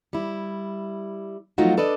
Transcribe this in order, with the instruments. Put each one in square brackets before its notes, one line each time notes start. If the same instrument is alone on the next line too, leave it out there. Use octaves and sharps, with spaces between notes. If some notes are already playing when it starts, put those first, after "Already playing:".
[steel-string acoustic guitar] G3 E4
F3 F#3 A3 D#4 F4 F#4
D4 A4 B4 D5 D#5